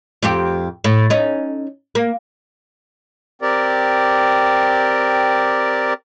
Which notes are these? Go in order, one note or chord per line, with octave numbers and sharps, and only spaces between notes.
F2 C4 G4
A2
C#4 D#4
A#3
C4 G4 A#4 D5